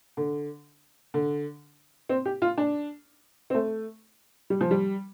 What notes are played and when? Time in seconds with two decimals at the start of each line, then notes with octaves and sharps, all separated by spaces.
0.17 D3
1.14 D3
2.09 C4
2.25 G4
2.42 F4
2.58 D4
3.50 C4
3.54 A3
4.50 G3
4.61 F3
4.71 G3